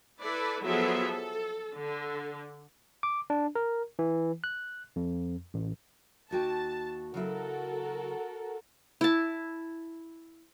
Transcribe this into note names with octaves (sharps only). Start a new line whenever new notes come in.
E4 A4 B4 D5
F3 F#3 B3 G#4 A4 E5
A4
D3
D6
D4
A#4
E3
F#6
F2
A1
D#2 F#4 G5 A5
C#3 F#3 E4 F#4 A4 A#4
E4 A5